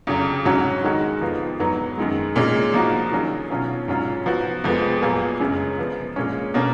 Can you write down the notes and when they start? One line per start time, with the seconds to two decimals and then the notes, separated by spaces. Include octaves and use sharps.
0.07 F2 C#3 F#3
0.45 G#2 F#3 C#4 F#4
0.84 D#3 G#3 D#4 F#4
1.21 F2 F3 B3 F4
1.59 G#2 F#3 B3 D#4
1.98 F#2 D#3 G#3
2.36 A#2 G#3 C#4 F4
2.74 F3 A#3 D#4 F#4
3.11 D#3 F#3 C#4 F4 G#4
3.50 B2 F#3 C#4 F4
3.88 G#2 F#3 C#4 F4
4.26 F3 B3 F#4
4.64 F2 F3 G#3 B3
5.02 A#2 F#3 B3 F4 G#4
5.40 F#2 C#3 G#3 C#4
5.78 F3 B3 F4
6.16 A#2 G#3 C#4
6.54 B2 A#3 C#4